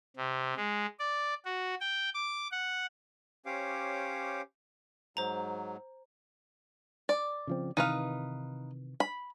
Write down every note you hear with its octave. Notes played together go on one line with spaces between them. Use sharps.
C3
G#3
D5
F#4
G5
D6
F#5
C#4 G4 C5 C#5 F5 D6
G#2 F#3 C5 A#5
D5
C#3 F3 C4
C3 D#3 E3 D#4 B4 F5
B5